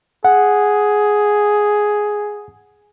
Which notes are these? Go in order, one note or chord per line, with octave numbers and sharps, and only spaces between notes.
G#4 F#5